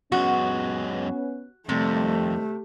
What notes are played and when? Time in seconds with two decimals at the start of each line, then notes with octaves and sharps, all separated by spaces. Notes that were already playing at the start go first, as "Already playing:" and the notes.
0.12 F#2 G#3 B3 C#4 F#4
1.69 F2 C3 D#3 G3 A3 C4